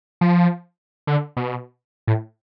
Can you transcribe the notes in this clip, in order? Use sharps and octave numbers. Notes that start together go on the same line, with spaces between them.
F3
D3
B2
A2